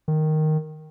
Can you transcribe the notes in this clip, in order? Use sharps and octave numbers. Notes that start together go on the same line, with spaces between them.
D#3